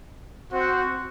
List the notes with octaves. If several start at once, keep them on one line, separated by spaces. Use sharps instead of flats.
C4 F#4 C5 F#5